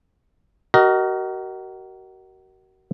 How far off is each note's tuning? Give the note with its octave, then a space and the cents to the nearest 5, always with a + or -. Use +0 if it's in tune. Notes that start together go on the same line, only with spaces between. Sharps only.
F#4 +35 A#4 +0 D#5 +0